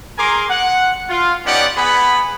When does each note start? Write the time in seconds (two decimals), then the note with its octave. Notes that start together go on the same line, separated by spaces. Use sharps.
0.18 G#4 A#4 G#5 A#5 C6 D6
0.50 F#5
1.09 F4
1.46 B3 C#4 D#4 G4 D5 F#5
1.77 B3 G#4 F#5 B5